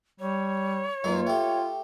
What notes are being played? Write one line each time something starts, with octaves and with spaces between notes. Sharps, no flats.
G3 C#5
F#2 G#3 A#3 D#4 F4 B4 D#5
A3 G4 G5